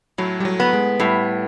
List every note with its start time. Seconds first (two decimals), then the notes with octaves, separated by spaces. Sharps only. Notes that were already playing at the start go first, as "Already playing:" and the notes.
0.18 A2 F#3
0.40 G3
0.45 F#3
0.60 B3
0.73 G#3
0.99 A2 G3